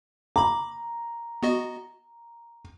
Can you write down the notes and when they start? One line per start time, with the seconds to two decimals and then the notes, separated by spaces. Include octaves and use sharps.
0.36 A#5 B5 D6
1.43 B3 F#4 D#5